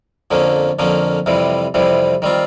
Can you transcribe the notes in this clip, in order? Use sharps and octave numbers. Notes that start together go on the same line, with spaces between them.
F2 D3 F3 A#3 C#4
F2 D3 F3 A#3 C#4
F2 C3 E3 G3
F2 C3 E3 G3
D#3 G3 C4 F4